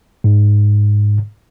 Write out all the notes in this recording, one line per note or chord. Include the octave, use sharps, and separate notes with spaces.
G#2